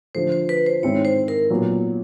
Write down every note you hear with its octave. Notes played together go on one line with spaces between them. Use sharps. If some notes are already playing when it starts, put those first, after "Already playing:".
D3 F3 A3 C5
C5
B4
C5
G#2 D#3 G#3 C4 E4 C#5
C5
A#4
A#2 F#3 B3